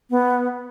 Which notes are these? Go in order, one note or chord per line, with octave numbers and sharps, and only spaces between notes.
B3